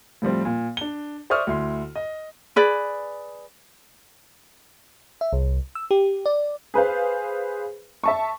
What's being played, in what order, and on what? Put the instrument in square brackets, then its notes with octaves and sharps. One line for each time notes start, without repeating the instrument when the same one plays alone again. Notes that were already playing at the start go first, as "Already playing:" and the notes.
[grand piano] A2 F3 G3 C4
A#2
D4 G7
C5 D5 E5 C#6 D#6 F6
D2 E4 C6
D#5
[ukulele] G#4 B4 D5
[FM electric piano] E5
C2
E6
G4
D5
[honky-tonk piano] G#4 B4 C5 F5
E5 A5 C#6